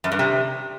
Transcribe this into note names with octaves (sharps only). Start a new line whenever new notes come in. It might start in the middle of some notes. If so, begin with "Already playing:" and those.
F#2
G2
C3